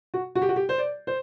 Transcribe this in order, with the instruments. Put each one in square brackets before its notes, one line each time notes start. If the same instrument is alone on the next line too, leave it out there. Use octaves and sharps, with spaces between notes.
[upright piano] F#4
F#4
G4
F#4
G4
C5
D5
C5